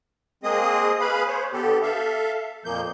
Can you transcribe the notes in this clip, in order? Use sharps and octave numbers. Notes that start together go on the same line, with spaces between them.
G#3 A#3 C4 G#4 D#5 D#6
G#4 B4 F5 B5
C5 C#5
D3 B3 G4 A4
A4 E5 F5
F2 A#2 F3 A#3 G6